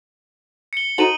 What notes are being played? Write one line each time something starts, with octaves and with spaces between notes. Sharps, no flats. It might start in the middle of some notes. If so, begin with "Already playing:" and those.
C#7 G7
D#4 F#4 A4 C5 D#7 F#7